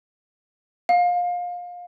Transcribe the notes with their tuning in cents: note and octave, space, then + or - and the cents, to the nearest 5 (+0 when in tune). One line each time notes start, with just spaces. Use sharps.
F5 +25